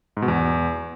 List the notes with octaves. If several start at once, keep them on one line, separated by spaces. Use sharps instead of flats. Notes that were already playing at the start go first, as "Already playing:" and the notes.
G#2
B2
E2